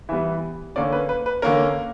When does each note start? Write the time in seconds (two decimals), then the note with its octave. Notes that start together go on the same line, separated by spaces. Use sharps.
0.09 E3 G3 B3 E5
0.76 D3 A#3 C#4 D5
0.93 B4
1.09 B4
1.26 B4
1.42 D3 A#3 C#4 A#4